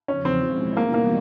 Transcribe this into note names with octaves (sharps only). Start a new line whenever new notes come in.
E2 C#3 F3 C#4
C4
B2 G#3 C#4 E4
E3 G3 A#3 B3 D#4 F#4
A#3